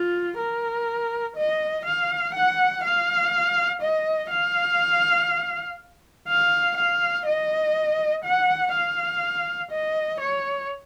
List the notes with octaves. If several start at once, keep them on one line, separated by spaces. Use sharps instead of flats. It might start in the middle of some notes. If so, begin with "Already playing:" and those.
Already playing: F4
A#4
D#5
F5
F#5
F5
D#5
F5
F5
F5
D#5
F#5
F5
D#5
C#5